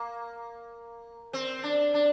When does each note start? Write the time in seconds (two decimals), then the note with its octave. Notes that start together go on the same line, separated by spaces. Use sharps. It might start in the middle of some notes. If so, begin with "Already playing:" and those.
Already playing: A#3
1.33 C4
1.63 D4
1.94 D4